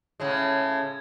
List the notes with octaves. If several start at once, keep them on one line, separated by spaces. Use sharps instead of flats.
A2 C#3 G#3